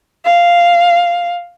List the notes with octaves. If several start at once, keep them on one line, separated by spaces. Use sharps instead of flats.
F5